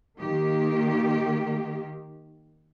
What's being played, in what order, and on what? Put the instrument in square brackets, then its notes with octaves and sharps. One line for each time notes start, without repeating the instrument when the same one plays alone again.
[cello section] D#3 A#3 G4